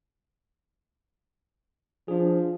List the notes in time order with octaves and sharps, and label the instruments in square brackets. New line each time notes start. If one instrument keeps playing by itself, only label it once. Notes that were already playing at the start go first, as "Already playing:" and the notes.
[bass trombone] F3 [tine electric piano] D4 G#4